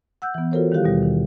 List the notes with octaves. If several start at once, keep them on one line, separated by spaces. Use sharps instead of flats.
F#5 E6 F#6 G6
E3 B3
F4 F#4 A4 A#4 C5 C#5
D#3 G3 E4 G4 F5 F#6
D#2 B2 G3
D#3